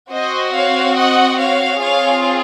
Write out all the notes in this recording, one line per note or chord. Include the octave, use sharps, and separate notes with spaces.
C4 F#4 C5 D#5
C#5 F5
D#5 F#5
C#5 F5
C4 F4 G#4 C#5 F5